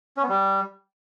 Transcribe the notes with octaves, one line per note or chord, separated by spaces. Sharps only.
C#4
B3
G3